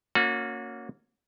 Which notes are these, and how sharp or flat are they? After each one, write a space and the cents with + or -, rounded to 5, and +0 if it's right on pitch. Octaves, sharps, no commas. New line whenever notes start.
A#3 -10 C#4 +5 F#4 -35